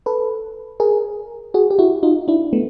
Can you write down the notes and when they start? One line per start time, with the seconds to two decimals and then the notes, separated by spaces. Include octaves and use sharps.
0.06 A4 B4
0.80 G#4 A#4
1.54 F#4 G#4
1.71 G4
1.79 E4 F#4
2.03 D#4 F4
2.28 D4 E4
2.53 A3 B3